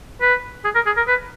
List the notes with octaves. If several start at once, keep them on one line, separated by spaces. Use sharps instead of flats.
B4
G#4
A#4
G#4
A#4
B4